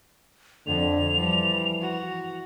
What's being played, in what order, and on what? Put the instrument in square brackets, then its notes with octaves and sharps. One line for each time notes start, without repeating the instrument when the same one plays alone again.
[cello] F2 [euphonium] D3 [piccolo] F7
[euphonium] E3 [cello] F3 G3
[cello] F#4